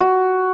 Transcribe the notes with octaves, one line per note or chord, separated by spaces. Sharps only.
F#4